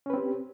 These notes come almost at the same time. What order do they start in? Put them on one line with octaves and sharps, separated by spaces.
C#4 B4 C4 G4